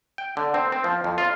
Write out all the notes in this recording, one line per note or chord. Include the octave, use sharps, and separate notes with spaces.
G5
D3
C4
C4
F3
F2
F4